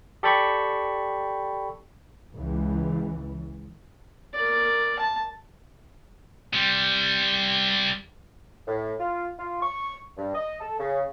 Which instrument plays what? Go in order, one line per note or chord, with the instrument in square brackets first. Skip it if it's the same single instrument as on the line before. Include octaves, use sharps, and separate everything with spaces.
[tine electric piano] G4 A4 D5 G5 B5 C#6
[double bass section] C#2 E3
[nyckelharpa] A#4 D5
A5
[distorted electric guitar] C3 G3
[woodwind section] A2
F4
F4
C#6
G2
D#5
A4
C#3